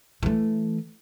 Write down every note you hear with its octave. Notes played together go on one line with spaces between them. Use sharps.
E3 A3